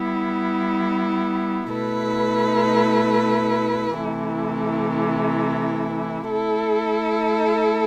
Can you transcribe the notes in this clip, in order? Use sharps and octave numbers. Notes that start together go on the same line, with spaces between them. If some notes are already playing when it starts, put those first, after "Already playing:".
Already playing: G3 B3 E4
B2 A3 E4 B4
C3 E3 A3 E4
A3 E4 A4